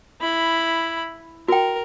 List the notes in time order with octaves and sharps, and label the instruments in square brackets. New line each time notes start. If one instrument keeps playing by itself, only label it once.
[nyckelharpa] E4 B5
[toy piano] F#4 G5 [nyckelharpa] A#4